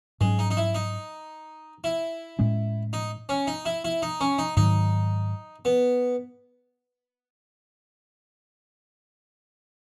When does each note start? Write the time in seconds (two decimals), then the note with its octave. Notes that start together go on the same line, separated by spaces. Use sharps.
0.21 G#2 F#3 G#3 C#4
0.39 D#4
0.51 D#4
0.57 E4
0.75 D#4
1.84 E4
2.39 A2 G#3 C#4
2.93 D#4
3.29 C#4
3.47 D#4
3.65 E4
3.85 E4
4.02 D#4
4.21 C#4
4.38 D#4
4.57 G#2 D#3 F#3 D#4
5.65 B3